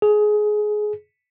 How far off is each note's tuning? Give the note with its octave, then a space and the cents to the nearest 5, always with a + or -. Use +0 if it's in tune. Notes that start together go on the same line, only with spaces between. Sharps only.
G#4 +20